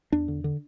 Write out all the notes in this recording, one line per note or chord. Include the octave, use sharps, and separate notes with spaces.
E2 D4
D3
D3